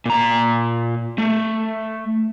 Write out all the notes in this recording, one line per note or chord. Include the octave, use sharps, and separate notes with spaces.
A#2 A#5
A3